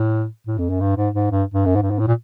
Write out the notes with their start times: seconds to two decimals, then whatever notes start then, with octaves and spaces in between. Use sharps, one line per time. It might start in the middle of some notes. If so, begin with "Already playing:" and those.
Already playing: A2
0.47 A2
0.58 F2
0.70 F#2
0.80 G2
0.97 G#2
1.15 G#2
1.31 G2
1.54 G2
1.66 F#2
1.76 G#2
1.82 G2
1.91 G#2
1.99 A2
2.08 A#2